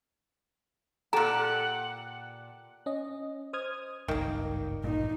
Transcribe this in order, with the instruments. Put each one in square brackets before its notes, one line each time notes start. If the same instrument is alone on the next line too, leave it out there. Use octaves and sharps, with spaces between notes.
[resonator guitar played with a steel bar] A#2 G4 [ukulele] A4 [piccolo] F#5 [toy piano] A#5
[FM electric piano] C#4 D#5
C5 D#6 F6 G#6
[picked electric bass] G#1 C#2 G2 [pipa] D#3 A#3
[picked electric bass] A1 G2 A#2 [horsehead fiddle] D#4